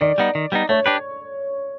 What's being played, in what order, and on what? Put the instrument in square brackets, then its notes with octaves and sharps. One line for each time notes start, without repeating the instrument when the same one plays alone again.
[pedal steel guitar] D#3 [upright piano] D5
[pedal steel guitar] G3 B3 D#4
D#3
G3 B3 D#4
[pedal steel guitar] A3 [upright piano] C#5
[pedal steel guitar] D4 G4 B4